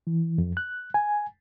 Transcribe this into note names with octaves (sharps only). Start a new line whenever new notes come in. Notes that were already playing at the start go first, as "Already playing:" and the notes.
E3
F2
F#6
G#5